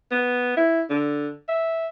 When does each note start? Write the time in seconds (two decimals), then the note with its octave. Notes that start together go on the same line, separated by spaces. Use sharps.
0.11 B3
0.57 E4
0.90 D3
1.48 E5